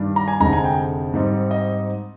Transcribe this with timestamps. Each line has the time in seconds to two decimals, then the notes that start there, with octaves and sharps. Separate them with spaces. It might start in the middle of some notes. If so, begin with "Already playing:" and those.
Already playing: G2 D#3 G3 D4
0.16 A#5
0.28 G#5
0.40 F1 F2 D3 G#3 D#4 A#5
0.53 G#5
0.64 G5
1.14 G#2 G3 C4 D#4
1.51 D#5